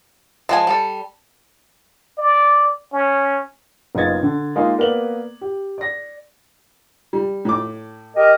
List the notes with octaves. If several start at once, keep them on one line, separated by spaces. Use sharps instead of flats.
F3 G#3 G#5 A5
G3 A4
D5
C#4
F#1 B3 D#4 F4 G#6 A6
D3
G#3 A#3 D#4 F4 G#4
A#3 B3 A#4 B4 D5 F#7
G4
D5 A#6
G3
A2 D6
G4 A#4 D#5